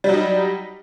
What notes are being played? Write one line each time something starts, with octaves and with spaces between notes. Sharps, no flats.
F#3 G3 D#4